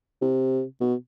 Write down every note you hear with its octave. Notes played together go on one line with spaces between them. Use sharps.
C3
B2